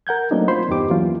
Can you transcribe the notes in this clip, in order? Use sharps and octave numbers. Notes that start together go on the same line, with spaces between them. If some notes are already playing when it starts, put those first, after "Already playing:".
A#4 F#5 G6 G#6
F#3 A3 A#3 C4 D4 D#4
F4 C5 B5 C6
E2 G2 B3 D#4 G4 D6
E3 F#3 A#3 C#4 F4